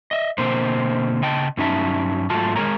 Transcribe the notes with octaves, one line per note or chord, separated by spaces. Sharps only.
D#5 E5
B2 D3 A#3 C4 C5
C#3 D#5 G5 A5
G2 F#3 C#4 D#4 E5 A5
G#2 F#3 A3 F4 A5
G#3 G#4 A#4 C#5 A#5